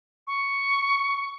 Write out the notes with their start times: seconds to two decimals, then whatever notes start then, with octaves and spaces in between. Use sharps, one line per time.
0.27 C#6